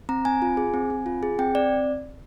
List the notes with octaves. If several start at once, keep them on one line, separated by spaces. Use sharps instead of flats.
C4 A#5
C4 G#5
F4
G#4
C4
C4
F4
G#4
C4 G5
C4 D5